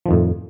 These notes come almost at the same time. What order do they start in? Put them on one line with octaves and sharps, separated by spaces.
F3 D#3 F2 A2